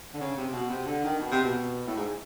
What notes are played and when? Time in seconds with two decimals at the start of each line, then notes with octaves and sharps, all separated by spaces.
0.13 D3
0.21 C#3
0.38 C3
0.53 B2
0.70 C3
0.86 D3
1.04 D#3
1.20 B2
1.32 C3
1.44 B2
1.86 A2
1.97 G#2